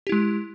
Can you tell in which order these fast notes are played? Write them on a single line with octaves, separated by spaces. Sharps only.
G4 E4 G#3